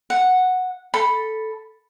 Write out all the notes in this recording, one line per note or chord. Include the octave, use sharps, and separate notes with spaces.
F#5
A4 B5